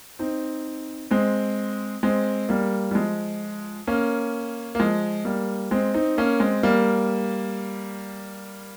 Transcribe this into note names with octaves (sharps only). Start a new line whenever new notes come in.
C4 D#4
G#3 C4
G#3 C4
G3 A#3
G3
F3 G#3
A#3 C#4
A#3
F3 G#3
G3 A#3
G#3 C4
C4 D#4
A#3 C#4
G#3 C4
G3 A#3